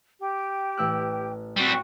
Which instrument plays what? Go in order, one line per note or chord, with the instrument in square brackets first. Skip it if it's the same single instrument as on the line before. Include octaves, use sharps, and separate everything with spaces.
[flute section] G4 G5
[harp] A1 E6 F#6
[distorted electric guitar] G3 C4 [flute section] F#4 C#6